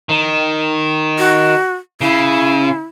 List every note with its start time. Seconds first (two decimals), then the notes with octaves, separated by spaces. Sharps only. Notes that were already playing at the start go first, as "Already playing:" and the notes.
0.09 D#3
1.19 F#4
2.01 C#3 E4